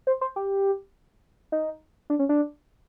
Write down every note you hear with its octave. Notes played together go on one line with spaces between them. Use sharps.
C5
C5
G4
D#4
D4
C#4
D4